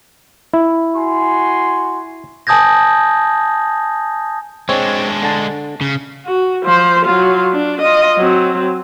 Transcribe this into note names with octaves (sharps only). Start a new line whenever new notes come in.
E4
F#4 G#5 C6
G#5 A5 D#6 G6 G#6 A#6
G#3 C4 D4 C#5
D3 A5
C#3
F#4
F3 C5
F#3 F4
D4
F4 D#5
F#3 C4